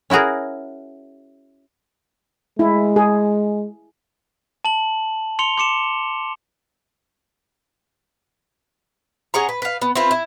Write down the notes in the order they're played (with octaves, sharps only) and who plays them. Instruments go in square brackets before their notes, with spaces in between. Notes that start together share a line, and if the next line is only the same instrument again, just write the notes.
[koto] C#4 E4 F#4 G#4 A#4
[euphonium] G#3 [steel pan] E4
[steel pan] G#4
[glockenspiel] A5 F#7
C6 C#7 F7 G7
C6 D6 C#7 E7
[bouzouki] C#4 G#4 F#5 A#5
B4
B4 F5
B3
C4 E4 F4 B4
E4